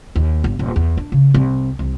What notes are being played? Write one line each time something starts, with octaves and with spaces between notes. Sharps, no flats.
D#2
G1
D#1
E2
D4
C#3
C2
C2